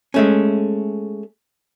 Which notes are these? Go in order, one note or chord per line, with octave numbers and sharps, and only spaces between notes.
G#3 A3 C#4